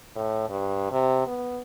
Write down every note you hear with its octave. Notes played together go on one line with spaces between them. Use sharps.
A2
G2
C3
B3